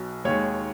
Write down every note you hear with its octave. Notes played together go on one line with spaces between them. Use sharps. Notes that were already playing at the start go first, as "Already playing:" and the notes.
Already playing: B1 B2 F#3
D#2 D#3 G#3 C#5